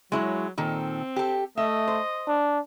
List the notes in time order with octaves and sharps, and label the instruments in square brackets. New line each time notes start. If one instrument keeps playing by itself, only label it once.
[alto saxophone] F#3 [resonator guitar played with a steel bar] G#3 E4 C#5
[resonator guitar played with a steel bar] A#2 D#3 A4 [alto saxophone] C4
[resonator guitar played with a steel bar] G4 A4
[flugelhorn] A3 [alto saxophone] D#5 [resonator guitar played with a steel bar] E5
[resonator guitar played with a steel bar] C5
[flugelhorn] D4